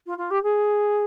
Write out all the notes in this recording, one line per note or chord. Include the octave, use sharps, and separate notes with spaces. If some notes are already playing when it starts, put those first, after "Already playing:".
F4
F4
G4
G#4